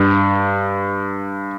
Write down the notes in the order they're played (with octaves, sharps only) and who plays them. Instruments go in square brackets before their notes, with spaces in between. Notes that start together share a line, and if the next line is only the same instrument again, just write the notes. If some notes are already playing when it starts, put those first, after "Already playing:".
Already playing: [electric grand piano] G2